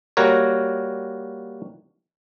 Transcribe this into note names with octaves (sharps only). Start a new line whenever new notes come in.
G3 A#3 F#4 A#4 C#5